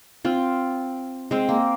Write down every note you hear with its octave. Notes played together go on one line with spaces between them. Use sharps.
C4 F4
G#3 C4
A#3